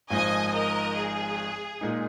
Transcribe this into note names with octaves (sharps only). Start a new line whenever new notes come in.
G#1 G#2 F3 D#5 G#5
A#4 D#5
G#4
A#2 G#3 D#4